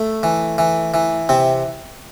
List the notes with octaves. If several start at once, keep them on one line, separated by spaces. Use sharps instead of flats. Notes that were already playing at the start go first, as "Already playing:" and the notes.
Already playing: A3
E3
E3
E3
C3 C4